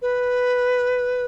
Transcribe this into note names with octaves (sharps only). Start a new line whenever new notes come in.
B4